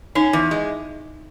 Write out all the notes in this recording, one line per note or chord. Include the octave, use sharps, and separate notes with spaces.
C#4 D#4
E2
G#3